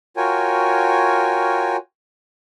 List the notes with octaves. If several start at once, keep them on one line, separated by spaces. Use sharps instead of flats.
F4 F#4 A#4 C#5 G5 G#5